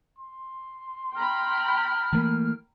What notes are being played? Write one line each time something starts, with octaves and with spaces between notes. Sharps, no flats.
C6
G5 A#5 B5 F6
E3 A3 A#3